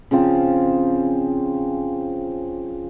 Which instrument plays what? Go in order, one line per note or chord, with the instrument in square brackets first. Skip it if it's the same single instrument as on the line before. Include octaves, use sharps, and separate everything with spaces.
[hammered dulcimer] C#3 F3 C4 F4